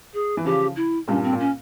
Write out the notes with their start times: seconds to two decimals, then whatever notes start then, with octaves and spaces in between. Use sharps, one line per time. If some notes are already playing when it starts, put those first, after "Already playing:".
0.14 G#4
0.37 E3
0.45 C#3 F3 G4
0.76 E4
1.08 G2 A#2 C#4
1.24 C4
1.33 A#2
1.40 C#4